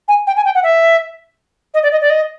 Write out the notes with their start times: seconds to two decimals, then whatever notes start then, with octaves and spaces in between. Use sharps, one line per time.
0.08 G#5
0.27 G5
0.37 G#5
0.45 G5
0.55 F#5
0.63 E5
1.74 D#5
1.83 D5
1.92 D#5
2.01 D5
2.10 D#5